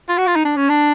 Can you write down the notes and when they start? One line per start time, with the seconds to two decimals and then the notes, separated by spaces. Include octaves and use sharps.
0.09 F4
0.18 F#4
0.27 F4
0.36 D#4
0.45 D4
0.57 C#4
0.70 D4